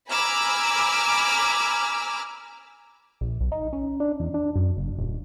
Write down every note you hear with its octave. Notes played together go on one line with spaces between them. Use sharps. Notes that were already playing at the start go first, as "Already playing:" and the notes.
G#5 A#5 B5 D6 E6 F6
A#1
B1
D#4
C#4
D4
E2
D4
F#2
F#1
D#1